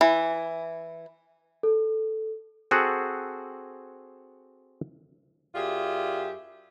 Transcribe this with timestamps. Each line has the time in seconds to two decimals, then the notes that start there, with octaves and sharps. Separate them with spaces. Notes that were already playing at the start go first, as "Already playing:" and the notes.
0.01 E3
1.63 A4
2.71 C4 F#4 G#4 A4 F#5
5.55 F#2 F4 G4 G#4 D5 E5